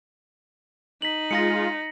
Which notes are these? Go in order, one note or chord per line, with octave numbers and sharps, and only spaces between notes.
D#4 B6 F#7
G#3 F4 A#6 C#7